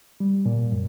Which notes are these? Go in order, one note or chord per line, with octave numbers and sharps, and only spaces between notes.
G3
A#2
F#2